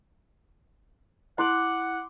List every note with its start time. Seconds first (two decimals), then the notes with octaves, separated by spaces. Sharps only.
1.38 E4 F#5 C6 D6 F#6 F#7